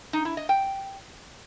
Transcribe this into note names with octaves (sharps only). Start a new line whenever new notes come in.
D#4
E4
D#5
G5